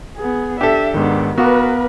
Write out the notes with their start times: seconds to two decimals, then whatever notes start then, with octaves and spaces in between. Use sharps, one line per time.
0.17 B3 G#4
0.61 D4 G4 A4 E5
0.94 G#2 D#3 B3 D4
1.38 B3 F#4 A#4 B4 F5 D6